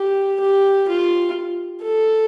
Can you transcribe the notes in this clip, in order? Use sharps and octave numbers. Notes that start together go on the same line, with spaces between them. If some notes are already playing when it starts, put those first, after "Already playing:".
Already playing: G4
G4
F4
A4